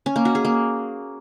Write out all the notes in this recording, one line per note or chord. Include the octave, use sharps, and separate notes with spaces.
C#4
A#3
F#4
G#4
A#3